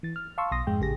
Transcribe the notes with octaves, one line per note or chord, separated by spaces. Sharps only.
E3 A6
F6
F5 A5 C6 C#6 E6
B1 B2 C6 D#6 A#6
F2 G#2 G#3 G5
A1 C#3 G4 G#4 A#6